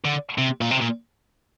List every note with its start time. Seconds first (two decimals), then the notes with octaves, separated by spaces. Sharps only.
0.05 D3
0.38 C3
0.61 A#2
0.71 C3
0.81 A#2